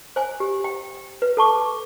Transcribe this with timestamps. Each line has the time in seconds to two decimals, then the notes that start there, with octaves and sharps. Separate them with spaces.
0.16 C5 G#5
0.40 G4
0.64 G5
1.22 B4
1.37 A4 A5 C#6 D6